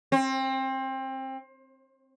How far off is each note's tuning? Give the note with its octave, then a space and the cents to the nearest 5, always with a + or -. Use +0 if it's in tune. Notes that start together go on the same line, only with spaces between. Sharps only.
C4 +25